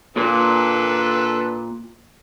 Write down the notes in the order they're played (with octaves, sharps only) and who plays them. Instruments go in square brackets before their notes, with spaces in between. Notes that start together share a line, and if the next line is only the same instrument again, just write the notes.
[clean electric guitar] A#2 [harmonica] D4 A4 B4